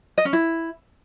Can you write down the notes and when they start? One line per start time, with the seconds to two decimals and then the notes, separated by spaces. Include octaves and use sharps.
0.18 D#5
0.25 C#4
0.33 E4